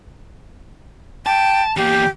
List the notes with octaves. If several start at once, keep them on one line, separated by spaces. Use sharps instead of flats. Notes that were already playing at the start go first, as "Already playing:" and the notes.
G5 A5
E2 A#3 G4